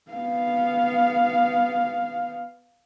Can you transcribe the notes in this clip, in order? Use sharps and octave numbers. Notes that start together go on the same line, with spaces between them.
B3 F5